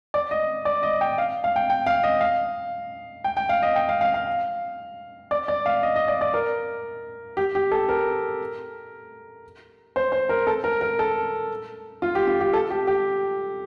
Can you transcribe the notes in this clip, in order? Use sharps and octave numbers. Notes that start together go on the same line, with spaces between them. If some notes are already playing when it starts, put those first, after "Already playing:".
D5
D#5
D5
D#5
G5
F5
F5
G5
G5
F5
D#5
F5
G5
G5
F5
D#5
G5
F5
F5
F5
D5
D5
F5
D#5
D#5
D5
D5
A#4
G4
G4
A4
A#4
C5
C5
A#4
A4
A#4
A#4
A4
F4
G4
F4
G4
A4
G4
G4